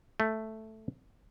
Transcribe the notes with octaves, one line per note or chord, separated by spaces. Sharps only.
A3